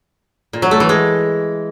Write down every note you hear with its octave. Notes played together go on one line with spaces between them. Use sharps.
A#2
F#3
A3
E3
G#3